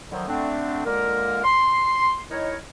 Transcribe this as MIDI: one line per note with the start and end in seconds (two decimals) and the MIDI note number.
0.11 0.26 45
0.11 0.26 50
0.11 0.26 51
0.11 0.26 53
0.11 0.26 54
0.28 0.82 50
0.28 0.82 57
0.28 0.82 60
0.28 0.82 62
0.86 1.42 46
0.86 1.42 50
0.86 1.42 56
0.86 1.42 58
0.86 1.42 70
1.44 2.20 84
2.31 2.56 51
2.31 2.56 63
2.31 2.56 64
2.31 2.56 70
2.31 2.56 73